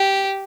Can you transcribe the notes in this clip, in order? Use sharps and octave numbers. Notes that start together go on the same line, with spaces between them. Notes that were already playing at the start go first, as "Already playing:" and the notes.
Already playing: G4